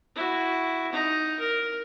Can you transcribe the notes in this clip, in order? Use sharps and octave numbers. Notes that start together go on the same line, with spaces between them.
E4 F#4
D#4 A#5
A#4